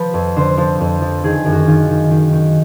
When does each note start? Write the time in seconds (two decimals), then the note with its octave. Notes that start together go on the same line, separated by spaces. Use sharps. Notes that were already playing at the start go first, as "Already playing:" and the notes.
Already playing: F3 B4
0.14 F2
0.36 D3 C5
0.58 F3
0.80 F2
1.01 F3
1.24 D#3 G#4
1.46 F#2
1.53 F#4
1.67 D#3 F4
1.89 D#3
2.11 D#3
2.32 D#3